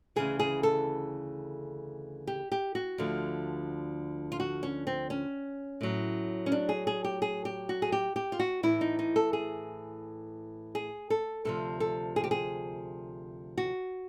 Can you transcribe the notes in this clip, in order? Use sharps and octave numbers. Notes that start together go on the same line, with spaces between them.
D2 C#3 E3 G#4
G#4
A4
G4
G4
F#4
D2 D3 F3
F4
F#4
C#4
C4
C#4
A2 F#3
C#4
D4
G#4
G#4
G4
G#4
G4
F#4
G#4
G4
G4
F4
F#4
A2 E3 E4
D#4
D#4
A4
G#4
G#4
A4
D2 C3 F3 A4
A4
G#4
G4
G#4
F#4